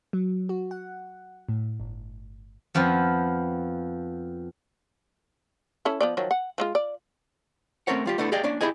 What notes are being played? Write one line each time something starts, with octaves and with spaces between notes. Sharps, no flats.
F#3
F#4
F#5
A2
G1
F2 F3 B3
C#4 E4 A4
F3 B3 D5
D#3 F3 F#3
F#5
F3 G#3 F4
D5
A3 C4 C#4 A#4 C#5 F#5
G3 F4 G4
A3 B3 D4 E4 A4
G4 G#4 D5 D#5 F5 G5
A#3 C#4 D4 D5
E4 G4 G#4 D#5 G#5